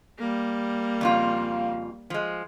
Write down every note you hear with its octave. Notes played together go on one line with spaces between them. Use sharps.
G3 A#3
F2 C#3 F4
F3 G#3